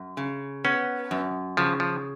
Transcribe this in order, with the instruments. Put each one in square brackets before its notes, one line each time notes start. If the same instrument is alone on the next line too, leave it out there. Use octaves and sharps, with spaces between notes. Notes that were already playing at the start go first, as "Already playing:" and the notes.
Already playing: [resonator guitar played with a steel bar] F#2
C#3
[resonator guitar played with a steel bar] B3 [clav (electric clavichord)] C#4
[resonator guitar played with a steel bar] F#2
[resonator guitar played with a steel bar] C#3 [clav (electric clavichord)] F3
[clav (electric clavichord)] F3